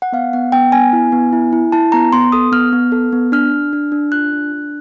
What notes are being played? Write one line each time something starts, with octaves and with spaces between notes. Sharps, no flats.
F#5
B3 F5
B3 F#5
B3 G5
B3 G#5
E4
B3
E4
E4
E4 A5
B3 A#5
B3 C6
A4 D#6
B3 F6
B3
A4
B3
D4 F6
D4
D4
D4
F4 F#6
D4
D4